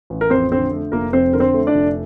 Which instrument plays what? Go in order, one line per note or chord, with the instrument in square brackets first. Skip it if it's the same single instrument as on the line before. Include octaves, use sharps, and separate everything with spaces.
[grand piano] A1
A#4
F2 C4 C5
D3 C4 C5
A3
F1 A#3 A#4
F2 C4 C5
D3 A#4
C4 C5
A3
D4 D5
F1